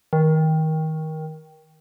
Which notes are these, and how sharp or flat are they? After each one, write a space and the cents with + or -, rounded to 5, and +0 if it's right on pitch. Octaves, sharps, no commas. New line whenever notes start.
D#3 +20